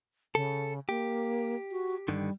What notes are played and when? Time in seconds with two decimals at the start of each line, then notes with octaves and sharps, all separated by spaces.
0.35 C#3 A4
0.89 A#3 G4
1.71 F#4
2.08 G2 D3 D#3 G3